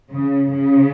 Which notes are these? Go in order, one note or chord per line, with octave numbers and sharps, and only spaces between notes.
C#3
C#3